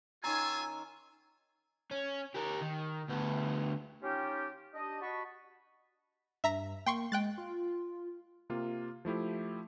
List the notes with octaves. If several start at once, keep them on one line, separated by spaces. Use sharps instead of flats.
D#3 C#4 F4 G#5 A#5 C6 E6
C#4
G4 A#4
D#3
D2 B3
C#4 D#4 F4 G4
D4 G4 D#5
F#4 D#5 A5 B5 C#6
G2 E5 A#5 B6
A#3 G5 C6 C#6
G#3 G5 F#6 A6
F4
C3 A#3 F4
F3 A3 E4 G4